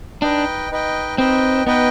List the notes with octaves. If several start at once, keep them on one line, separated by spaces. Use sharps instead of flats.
D4 D#4 B4 D#5 G5
D#4 B4 D#5 G5
C4 D#4 B4 D#5 G5
B3 D#4 B4 D#5 G5